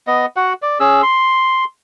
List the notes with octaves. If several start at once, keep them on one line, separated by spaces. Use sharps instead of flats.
B3 D#5
F#4 F#5
D5
C#4 G#4 E6
C6